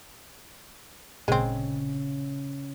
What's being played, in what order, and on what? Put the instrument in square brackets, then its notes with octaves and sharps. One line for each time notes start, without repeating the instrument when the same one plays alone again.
[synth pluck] G#1 A#2 [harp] C#3 [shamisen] G#3 C4